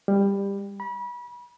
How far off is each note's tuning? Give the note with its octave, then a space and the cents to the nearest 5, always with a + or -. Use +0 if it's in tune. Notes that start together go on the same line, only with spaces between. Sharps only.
G3 +20
B5 -30